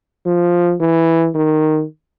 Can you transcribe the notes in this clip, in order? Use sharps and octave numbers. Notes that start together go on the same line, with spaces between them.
F3
E3
D#3